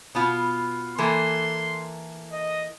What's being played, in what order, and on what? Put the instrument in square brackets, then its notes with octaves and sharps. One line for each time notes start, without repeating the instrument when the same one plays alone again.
[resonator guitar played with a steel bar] B2 B3 F4
[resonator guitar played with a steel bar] E3 A#3 A4 [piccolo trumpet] C6
[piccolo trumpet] D#5